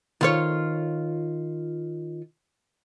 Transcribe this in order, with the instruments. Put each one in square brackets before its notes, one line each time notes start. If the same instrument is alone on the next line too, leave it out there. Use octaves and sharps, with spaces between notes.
[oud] D#3 F4 C#5